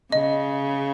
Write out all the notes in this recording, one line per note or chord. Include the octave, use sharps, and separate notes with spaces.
C#3 D#5